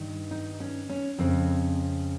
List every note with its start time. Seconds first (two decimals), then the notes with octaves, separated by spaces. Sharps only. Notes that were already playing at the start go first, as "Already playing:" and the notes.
Already playing: G2 D#3
0.31 D#4
0.60 C#4
0.90 C#4
1.18 F2 C#3 C4